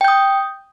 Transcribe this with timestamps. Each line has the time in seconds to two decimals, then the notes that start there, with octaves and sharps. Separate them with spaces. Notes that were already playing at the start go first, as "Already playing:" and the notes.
0.01 G5
0.04 G6
0.08 D#6